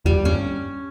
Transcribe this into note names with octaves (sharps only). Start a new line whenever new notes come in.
E2 G3
G2 C#4